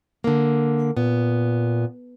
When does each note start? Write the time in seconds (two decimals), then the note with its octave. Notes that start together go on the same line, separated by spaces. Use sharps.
0.24 D3 A#3
0.97 A#2 B3